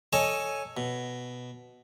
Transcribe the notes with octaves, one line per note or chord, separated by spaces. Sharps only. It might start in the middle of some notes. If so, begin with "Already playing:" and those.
A4 C#5 D#5 G#5 A5
B2